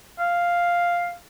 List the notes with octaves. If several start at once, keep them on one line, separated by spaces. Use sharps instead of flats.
F5